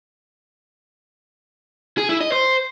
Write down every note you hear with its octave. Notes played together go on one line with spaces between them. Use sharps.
G#4
E4
D#5
C5